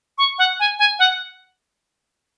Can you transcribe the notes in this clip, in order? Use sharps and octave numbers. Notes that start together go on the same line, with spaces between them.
C#6
F#5
G#5
G#5
F#5